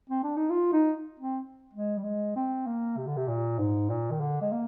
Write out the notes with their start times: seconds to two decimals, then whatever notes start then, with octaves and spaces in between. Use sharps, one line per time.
0.10 C4
0.23 D4
0.37 D#4
0.50 F4
0.73 D#4
1.20 C4
1.74 G#3
1.98 G3
2.04 G#3
2.36 C4
2.67 A#3
2.97 C3
3.07 D3
3.17 C3
3.28 A#2
3.59 G#2
3.90 A#2
4.11 D#3
4.21 D3
4.41 G#3
4.52 A#3